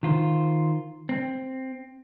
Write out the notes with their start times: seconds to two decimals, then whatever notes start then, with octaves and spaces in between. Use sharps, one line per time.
0.03 D#3 F4 C5
1.09 C4